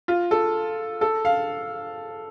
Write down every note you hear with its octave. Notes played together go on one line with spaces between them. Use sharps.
F4
A4
A4
F5